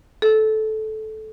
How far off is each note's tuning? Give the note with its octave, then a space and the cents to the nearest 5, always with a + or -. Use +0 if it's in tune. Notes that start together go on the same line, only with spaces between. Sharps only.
A4 -15